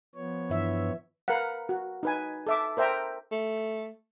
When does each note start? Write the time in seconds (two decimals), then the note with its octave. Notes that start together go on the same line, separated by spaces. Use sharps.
0.15 F3 B3 C#5
0.50 G2 E3 E5
1.28 A#4 B4 F5 F#5
1.69 F#4
2.03 D#4 B4 G#5
2.47 A4 E5 D6
2.77 A#4 C5 E5 G5 A#5
3.32 A3